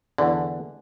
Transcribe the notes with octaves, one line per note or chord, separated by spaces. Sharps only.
E2 D3